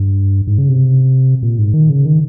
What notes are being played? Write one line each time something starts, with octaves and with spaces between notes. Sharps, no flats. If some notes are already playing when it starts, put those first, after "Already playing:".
Already playing: G2
G#2
C#3
C3
A#2
G#2
D#3
C#3
D#3